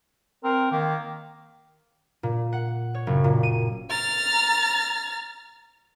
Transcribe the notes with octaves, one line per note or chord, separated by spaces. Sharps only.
C4 A#4
D#3 A#3
A#2
F#5
C#5
F#1
A#2
D#7
A#5 F6 A6